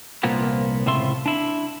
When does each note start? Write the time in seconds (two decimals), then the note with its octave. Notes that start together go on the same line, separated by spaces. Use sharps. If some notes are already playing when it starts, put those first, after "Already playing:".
0.23 C2 A#2 F3 A#3 B3
0.86 C#2 A2 C3 F4 E5 C6
1.26 D4 E4